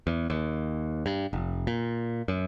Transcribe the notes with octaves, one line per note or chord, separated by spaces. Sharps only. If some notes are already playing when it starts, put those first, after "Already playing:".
E2
D#2
G2
F1
A#2
F#2